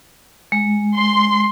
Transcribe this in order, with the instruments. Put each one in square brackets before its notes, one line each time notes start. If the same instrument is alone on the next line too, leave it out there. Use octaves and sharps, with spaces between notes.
[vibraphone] G#3
[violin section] C6